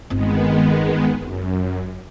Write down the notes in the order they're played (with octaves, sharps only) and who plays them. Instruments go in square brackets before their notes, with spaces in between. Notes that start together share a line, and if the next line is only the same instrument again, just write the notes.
[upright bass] G1 C4 [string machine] D#3 G#3 B3
[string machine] F#2